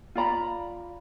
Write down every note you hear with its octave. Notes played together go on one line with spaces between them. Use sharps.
F4 D5 A#5 B5